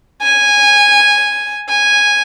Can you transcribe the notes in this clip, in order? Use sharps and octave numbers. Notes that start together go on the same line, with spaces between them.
G#5
G#5